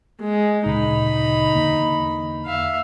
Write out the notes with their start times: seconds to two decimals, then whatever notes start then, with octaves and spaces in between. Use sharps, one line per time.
0.20 G#3
0.66 D2 A#2 C#3 D#4 B5
1.55 E2 D3 A#3
2.46 E5 F5